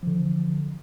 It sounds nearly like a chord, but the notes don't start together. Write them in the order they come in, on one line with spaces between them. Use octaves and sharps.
F3 D3 E3